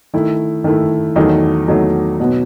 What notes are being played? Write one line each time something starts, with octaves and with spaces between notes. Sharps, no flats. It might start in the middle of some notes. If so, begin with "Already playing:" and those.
D#3 A3 E4
D#3 A3 E4
E2 D#3 F#3 A3 D#4
E2 D#3 F#3 A3 D#4
B2 F#3 B3